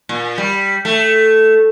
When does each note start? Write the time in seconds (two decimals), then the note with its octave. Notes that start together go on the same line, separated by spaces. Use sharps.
0.09 A#2
0.38 G3
0.85 A3